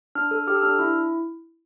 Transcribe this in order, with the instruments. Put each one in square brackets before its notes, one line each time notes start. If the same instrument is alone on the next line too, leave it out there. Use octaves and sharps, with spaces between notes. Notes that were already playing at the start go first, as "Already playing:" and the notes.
[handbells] D4 F6
A4
G4 F6
E6
D4 F6
E4